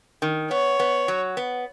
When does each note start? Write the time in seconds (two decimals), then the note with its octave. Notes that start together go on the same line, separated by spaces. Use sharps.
0.22 D#3
0.50 B3 C#5
0.79 B3
1.08 F#3
1.37 B3